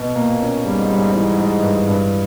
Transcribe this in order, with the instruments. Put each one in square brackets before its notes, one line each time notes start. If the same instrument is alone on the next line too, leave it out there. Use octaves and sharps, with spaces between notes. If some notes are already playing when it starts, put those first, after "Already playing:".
Already playing: [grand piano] B2
[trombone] A#2 [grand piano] A#3
[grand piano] C#4
[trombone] G#2 [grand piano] G3
[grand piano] G3
[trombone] G#2 [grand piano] E3
[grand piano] G#3
G2
G2